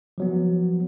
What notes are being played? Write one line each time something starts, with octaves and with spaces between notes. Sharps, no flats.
F3 F#3 B3